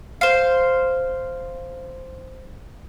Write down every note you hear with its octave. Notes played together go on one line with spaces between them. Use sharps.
C5 F5